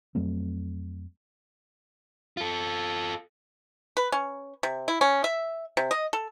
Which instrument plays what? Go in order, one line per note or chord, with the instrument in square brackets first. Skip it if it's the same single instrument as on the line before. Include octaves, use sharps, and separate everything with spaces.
[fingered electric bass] F2 F#3 A3 C4
[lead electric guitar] F4 A4
[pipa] B4
C#4
C3
E4
C#4
E5
C3
D#5
A4